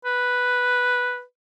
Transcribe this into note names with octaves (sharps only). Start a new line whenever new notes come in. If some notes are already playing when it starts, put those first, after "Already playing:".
B4